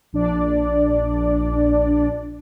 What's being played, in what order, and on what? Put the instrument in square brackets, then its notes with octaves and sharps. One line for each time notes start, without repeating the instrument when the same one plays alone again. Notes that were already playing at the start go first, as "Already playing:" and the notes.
[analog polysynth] A#1 D4 D5